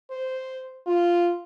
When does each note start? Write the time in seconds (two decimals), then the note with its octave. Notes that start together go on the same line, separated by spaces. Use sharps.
0.11 C5
0.86 F4